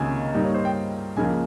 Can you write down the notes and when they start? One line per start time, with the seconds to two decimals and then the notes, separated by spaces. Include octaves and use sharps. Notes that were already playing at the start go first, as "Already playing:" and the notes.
Already playing: C#2 C3 D#3 A#3 C#4 G#5
0.34 G2 G3 A#3 D#4
0.45 C#5
0.54 C5
0.65 G5
1.17 C#2 C#3 F3 A#3 G#5